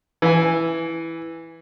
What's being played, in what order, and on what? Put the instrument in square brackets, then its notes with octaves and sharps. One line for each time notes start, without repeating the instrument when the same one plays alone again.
[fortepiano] E3 G#5